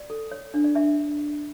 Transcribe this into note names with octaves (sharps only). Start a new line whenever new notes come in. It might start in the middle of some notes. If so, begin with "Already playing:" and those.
Already playing: D5
A4
C#5
D4
D5
D4 E5